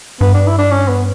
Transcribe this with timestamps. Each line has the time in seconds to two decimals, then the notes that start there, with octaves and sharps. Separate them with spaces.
0.21 G2 B3
0.34 D4
0.47 E4
0.59 D4
0.71 C#4
0.89 B3